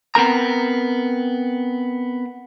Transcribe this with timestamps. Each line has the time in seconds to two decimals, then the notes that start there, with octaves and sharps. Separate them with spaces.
0.15 B3 C4 A#4 A#5